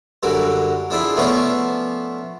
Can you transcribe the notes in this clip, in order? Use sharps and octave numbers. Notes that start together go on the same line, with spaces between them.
F#2 D3 F#3 G3
F3 D4 E4 G#4
F3 A3 B3 C#4 C#5 D5